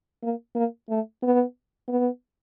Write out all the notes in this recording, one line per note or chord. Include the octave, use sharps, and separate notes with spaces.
A#3
A#3
A3
B3
B3